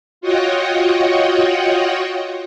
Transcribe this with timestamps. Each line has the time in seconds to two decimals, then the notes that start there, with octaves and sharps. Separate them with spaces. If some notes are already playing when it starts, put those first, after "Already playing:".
0.21 F4 F#4 C#5 D#5 F#5 G5